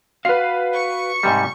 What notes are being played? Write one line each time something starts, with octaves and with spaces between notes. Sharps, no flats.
F#4 B4 F5 C7
C#6 C#7
G#2 C3 G3